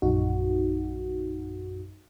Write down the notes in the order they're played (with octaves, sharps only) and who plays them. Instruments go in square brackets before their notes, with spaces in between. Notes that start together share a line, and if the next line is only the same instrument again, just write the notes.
[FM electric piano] A#1 F#2 D#4 F#4